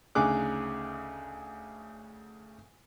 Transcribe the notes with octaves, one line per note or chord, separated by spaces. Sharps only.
D2 C#3 D#4 G#4 D6 F#6